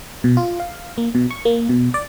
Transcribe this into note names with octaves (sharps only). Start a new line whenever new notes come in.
B2
F4
F5
A#3
B2
C#6
A#3
B2
D5